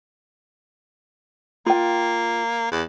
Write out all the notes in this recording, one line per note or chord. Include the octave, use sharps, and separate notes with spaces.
A#3 F4 G5
E2